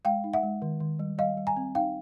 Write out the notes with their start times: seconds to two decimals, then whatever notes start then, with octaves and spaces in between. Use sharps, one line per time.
0.05 G#3 F5 G5
0.24 D#4
0.33 E5 F#5
0.43 G#3
0.62 D#3
0.80 D#3
0.99 G3
1.18 G3 D#5 F5
1.37 G3
1.47 G#5 A#5
1.57 C4
1.75 D#4 F5 G5